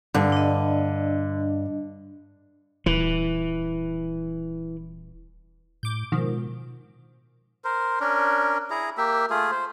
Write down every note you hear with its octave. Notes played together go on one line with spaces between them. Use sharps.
G2 D3
D4 D#5
D#1 E3
A2 D6 G6
G#2 B2 D#3 F3
A#4 C5
C#4 D4 A#4
E4 G#4 A#5
A#3 G4 E5
A3 F4 G#4
C5